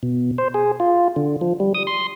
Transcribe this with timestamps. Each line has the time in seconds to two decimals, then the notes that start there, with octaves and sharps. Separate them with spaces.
0.03 B2
0.38 C5
0.54 G#4
0.80 F4
1.16 D3
1.41 F3
1.60 G3
1.75 D#6
1.87 C6